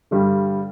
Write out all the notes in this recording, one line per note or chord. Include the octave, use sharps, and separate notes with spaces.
G2 D3 G3